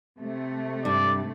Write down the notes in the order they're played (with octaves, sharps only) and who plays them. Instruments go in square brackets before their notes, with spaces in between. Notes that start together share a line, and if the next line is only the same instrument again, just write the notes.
[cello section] C3 A3
[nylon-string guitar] G2 [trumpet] D5